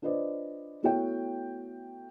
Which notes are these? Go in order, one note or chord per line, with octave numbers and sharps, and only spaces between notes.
D4 F4 B4 C5 D5 D#5
A3 B3 E4 F#4 C#5 G5